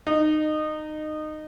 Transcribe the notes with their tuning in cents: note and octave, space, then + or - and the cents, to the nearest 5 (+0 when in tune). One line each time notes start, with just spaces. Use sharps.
D#4 -20